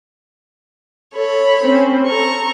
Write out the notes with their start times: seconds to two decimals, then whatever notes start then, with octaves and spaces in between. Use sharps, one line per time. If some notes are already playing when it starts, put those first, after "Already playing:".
1.15 A4 C#5 B5
1.61 C4 C#4 C5
2.07 A4 A#5 C#6